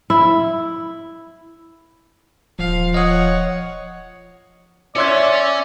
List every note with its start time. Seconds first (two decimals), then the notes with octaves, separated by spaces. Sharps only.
0.10 E4
2.59 D#1 F3 F5
2.94 C#5 D#5 F#5 D#6
4.96 C#4 C#5 D5 E5 C6 G#6